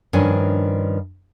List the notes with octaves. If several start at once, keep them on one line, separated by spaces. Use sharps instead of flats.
G2 D#3 F3 C#4 D4 G#5